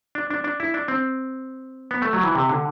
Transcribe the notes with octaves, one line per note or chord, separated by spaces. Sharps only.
D4
D4
D4
E4
D4
C4
B3
A3
F#3
E3
C3
D3